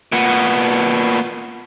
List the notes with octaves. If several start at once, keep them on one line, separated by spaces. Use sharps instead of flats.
A#2 B3